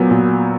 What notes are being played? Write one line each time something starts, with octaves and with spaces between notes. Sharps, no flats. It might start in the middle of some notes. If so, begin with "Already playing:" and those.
Already playing: A#2 F#3 B3
A#2